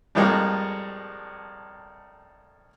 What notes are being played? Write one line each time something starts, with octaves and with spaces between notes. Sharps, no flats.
F2 A2 G3 G#3 A#3